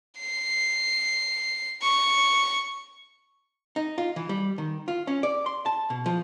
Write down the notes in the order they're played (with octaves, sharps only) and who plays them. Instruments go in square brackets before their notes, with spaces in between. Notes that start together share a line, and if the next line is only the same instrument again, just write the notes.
[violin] C7
C#6
[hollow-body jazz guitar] D#4
F4
E3
G3
D#3
F4
C#4
D5
C6
A5
B2
F3